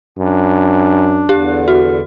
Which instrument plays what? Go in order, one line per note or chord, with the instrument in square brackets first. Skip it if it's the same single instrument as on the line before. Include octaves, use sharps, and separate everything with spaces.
[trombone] F#2 [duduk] D4
[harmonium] E2 D3 [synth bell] G4
[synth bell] F#4